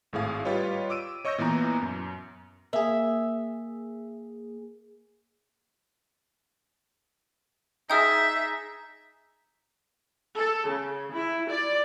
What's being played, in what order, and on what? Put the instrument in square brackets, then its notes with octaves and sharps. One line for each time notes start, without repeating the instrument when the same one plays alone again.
[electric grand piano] G#1 A2 G#4 F5
G3 F4 G4 B4 C#5 D#5
D6 E6 D7 D#7
C#5 D#5 C#6 E6 G6 A#6
A#2 E3 A#3 B3 A#5
F#2
[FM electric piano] A#3 G#4 [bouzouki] E5
[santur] D#4 G#4 A#5 [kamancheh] E5 [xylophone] G5 D#6 F6
[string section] A4
C#3
E4
D5